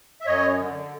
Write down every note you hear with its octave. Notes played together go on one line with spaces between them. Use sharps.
E5
F#2 C#5 D#5
D3